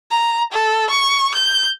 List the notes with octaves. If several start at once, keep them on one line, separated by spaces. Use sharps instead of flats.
A#5
A4
C#6
G6